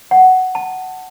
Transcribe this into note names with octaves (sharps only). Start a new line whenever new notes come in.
F#5
A5